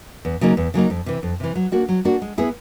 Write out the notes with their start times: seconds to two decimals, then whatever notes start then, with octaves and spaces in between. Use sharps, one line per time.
0.25 E2
0.41 C#3 F#3 A#3 D#4
0.57 E2
0.74 C#3 F#3 A#3 D#4
0.90 F2
1.06 C3 E3
1.23 F2
1.40 C3 E3
1.55 F#3
1.72 A#3 D4 F#4
1.89 F#3
2.05 A#3 D4 F#4
2.22 G#3
2.38 B3 E4 G#4